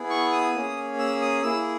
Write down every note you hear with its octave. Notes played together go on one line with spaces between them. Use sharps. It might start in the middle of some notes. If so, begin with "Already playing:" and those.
Already playing: B3 E4 G#4
C#6
D#6
A#3 C#4 G#4
E6
D#6
A#3 E4 G#4 E6